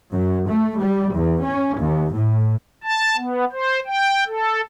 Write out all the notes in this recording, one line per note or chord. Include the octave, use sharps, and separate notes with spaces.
F#2
A3
G3
E2
C#4
D#2
A2
A5
B3
C5
G5
A4